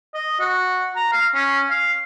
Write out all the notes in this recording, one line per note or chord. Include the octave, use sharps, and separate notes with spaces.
D#5
F#4
A#5
F5
C#4
F5